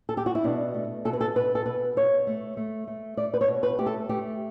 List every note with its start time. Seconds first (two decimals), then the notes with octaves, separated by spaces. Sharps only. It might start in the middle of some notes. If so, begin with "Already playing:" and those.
0.09 A4
0.17 G4
0.26 F#4
0.35 E4
0.44 B2 D4
0.74 A3
1.05 B2 A4
1.13 B4
1.21 A4
1.35 B2 B4
1.55 A4
1.66 B2 B4
1.96 B2 C#5
2.27 A3
2.57 A3
2.87 A3
3.17 A3 D5
3.34 B4
3.41 C#5
3.48 B2
3.63 B4
3.78 A3 G4
3.86 A4
4.09 A3 G4